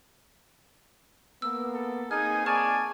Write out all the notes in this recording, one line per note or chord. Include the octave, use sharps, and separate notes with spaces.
A#3 B3 E6
A4
A#3 C4 D#4 G#4 G#5 F6
D5 G#5 A5 C#6 F6